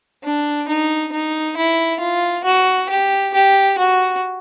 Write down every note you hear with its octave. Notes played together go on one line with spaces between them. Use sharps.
D4
D#4
D#4
E4
F4
F#4
G4
G4
F#4